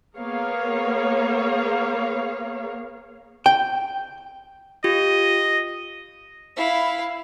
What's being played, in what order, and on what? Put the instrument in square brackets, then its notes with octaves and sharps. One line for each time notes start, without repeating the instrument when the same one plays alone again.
[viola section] A#3 B3 G#4 A#4 C#5 F5
[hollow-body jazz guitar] G5
[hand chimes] F4 G4 [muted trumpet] D#5
[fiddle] E4 F5